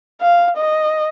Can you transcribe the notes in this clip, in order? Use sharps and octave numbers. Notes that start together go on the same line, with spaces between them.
F5
D#5